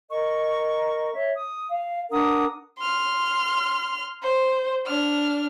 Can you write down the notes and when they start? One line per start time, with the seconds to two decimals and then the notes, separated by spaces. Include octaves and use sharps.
0.10 A#4 D#5 C#6
1.14 C#5 E5
1.35 D#6
1.70 F5
2.10 D4 A#4 F#5 D#6
2.79 C6 F6
4.23 C5
4.86 D4 F6